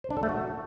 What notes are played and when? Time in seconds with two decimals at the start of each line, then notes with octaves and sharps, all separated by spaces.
0.04 C5
0.10 D4
0.17 A4
0.23 A3
0.29 F#4